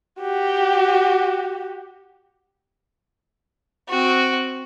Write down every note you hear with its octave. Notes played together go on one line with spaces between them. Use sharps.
F#4 G4
C4 F#4